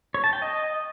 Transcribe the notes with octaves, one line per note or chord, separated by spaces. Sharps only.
C#5
A5
G5
D#5